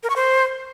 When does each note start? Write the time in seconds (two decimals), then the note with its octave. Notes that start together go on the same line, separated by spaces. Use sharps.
0.03 A#4
0.10 C#6
0.16 C5